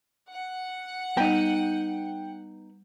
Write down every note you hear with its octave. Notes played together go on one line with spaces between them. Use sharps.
F#5
G3 B3 D#4 G5